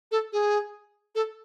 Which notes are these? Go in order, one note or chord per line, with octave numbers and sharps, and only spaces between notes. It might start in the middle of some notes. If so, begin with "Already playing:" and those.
A4
G#4
A4